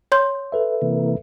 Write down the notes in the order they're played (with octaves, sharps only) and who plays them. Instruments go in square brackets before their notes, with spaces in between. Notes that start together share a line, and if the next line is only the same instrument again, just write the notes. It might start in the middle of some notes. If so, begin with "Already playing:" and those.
[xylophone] C#5 C6 G6
[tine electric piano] A4 B4 E5
[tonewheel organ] C3 E3 A#3